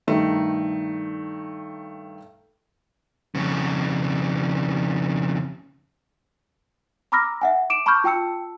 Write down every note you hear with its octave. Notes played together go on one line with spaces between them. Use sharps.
G2 D#3 A3 D#4
F2 C#3
A#5 B5 D6 E6 F6 A#6
E5 F#5 G#5
D6 D7 E7
A5 B5 C#6 D6 F6 G6
F4 G5 A5 E6 C#7